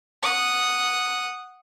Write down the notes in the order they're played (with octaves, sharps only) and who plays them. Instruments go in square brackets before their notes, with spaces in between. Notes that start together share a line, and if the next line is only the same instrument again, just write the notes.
[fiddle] F#5 D#6